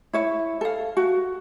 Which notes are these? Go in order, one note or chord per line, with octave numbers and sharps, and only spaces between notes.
E4 C#5 E5
A4 F5
F#4